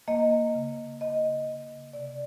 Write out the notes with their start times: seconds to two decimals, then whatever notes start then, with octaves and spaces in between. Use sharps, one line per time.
0.08 A#3 D#5
0.55 C#3
1.01 C#3 D#5
1.47 C#3
1.93 C3 D5